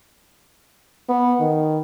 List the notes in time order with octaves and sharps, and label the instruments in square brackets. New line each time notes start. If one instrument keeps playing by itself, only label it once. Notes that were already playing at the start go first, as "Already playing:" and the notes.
[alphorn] B3
D#3